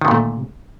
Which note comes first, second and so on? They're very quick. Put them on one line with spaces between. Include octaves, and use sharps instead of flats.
D#3 D3 A#2 A3